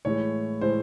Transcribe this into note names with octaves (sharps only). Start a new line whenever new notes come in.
A2 E3 G#3 C#5
A2 E3 G#3 C5